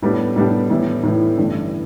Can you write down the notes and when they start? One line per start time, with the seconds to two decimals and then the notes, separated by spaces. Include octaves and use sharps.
0.02 A2 G3 B3 D4 G4
0.36 A2 G3 B3 D4 G4
0.70 A2 E3 G3 B3 E4
1.04 A2 E3 G3 B3 E4
1.38 A1 G2 D3 A3 D4